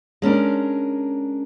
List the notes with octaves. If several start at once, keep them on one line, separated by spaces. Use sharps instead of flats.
G#3 C#4 D4 A#4